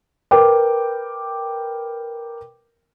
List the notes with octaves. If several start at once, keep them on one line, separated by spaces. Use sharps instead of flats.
A#4 B4 G5 D6